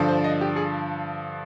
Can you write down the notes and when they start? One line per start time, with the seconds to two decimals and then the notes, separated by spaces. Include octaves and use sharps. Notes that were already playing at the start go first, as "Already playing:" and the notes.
Already playing: G2 D3 F3
0.08 C5
0.24 D#5
0.41 G4
0.56 G#4